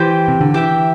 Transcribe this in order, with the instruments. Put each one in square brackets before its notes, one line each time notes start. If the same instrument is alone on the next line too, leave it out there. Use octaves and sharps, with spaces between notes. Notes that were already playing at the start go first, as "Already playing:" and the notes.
Already playing: [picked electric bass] E3 [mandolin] G4 C5 G5
[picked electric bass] C3
D3
[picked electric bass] E3 [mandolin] G4 E5 G5